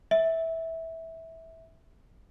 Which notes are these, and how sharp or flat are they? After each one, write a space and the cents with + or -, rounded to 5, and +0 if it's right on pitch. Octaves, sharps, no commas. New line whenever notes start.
E5 -15